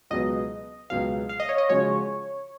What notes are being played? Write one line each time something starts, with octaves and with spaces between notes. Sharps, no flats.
C#2 B2 F#3 B3 D#5
C#2 B2 F#3 B3 F5
F5
D#5
C#5
D#5
C#3 F3 G#3 C#4 F#4 C#5